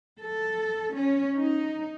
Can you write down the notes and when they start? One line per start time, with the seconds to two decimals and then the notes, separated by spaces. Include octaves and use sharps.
0.19 A4
0.95 C#4
1.38 D#4